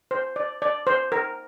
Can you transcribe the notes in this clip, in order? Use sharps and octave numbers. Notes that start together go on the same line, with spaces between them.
C5
D5
D5
C5
A#4